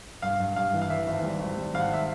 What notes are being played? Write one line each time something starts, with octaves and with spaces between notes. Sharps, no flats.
G2 F5
G2
G2 F5
E3
F5
E3 E5
G#1
G3
G#1
G3
G#1 F5
F#5
E5